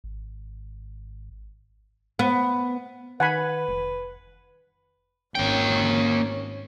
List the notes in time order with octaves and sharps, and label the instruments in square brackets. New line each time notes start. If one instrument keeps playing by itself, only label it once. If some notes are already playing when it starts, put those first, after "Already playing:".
[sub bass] G#1
[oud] B3
[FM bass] D#3 [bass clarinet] B4 [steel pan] F#5 G#5 B5
[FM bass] F1
[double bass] G#1 C#4 [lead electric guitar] A#3 G5